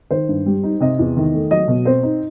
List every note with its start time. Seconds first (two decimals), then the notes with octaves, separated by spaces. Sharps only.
0.11 D#3 C5
0.29 G2
0.46 G3
0.63 D#4
0.81 C3 D#5
0.99 E2
1.17 D#3
1.34 A3
1.51 F#3 D#5
1.68 B2
1.85 C4 C5
2.03 D#4